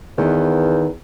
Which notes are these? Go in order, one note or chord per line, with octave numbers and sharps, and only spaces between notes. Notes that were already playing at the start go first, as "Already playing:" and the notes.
E2 D#3 B3 D#4